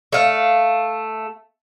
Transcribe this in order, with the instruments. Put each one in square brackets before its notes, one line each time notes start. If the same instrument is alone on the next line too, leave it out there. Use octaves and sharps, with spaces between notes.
[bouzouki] A3 F5